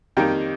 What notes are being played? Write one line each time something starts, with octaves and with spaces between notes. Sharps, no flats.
F2 D#3 G3 A#3 D#4 G5